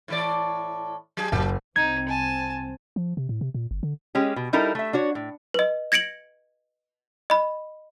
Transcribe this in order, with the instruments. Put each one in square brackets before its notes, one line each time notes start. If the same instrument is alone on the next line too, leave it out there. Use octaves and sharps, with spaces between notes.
[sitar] A2 E3 D5
F#3 G#4
[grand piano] F#1 [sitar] F#3
[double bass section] C2 C4 [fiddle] D#4 [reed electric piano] G#6
[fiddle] G#5 A5
[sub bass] F3
C3
A2
C3
A#2
G1
D3
[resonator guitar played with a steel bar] G#3 C#4 G4
B2
G3 D#4 E4 A4 A#4
A3 E5
D4 F#4 C#5
A2
[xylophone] B4 D#5
G#6 A#6 C#7 D7 F#7
D#5 B5